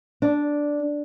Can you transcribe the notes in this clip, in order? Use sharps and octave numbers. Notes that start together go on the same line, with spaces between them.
D4